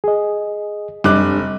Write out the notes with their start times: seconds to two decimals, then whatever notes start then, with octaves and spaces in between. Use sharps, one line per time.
0.04 G#4 D#5
1.04 F1 F#2 G3 D4 D6 F#6